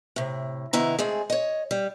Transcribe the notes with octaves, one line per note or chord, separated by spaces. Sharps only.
A2 C3
C3 D#3 B3 E4 A#5
G#3 A3 C4 G#4
C#5 D#5
G3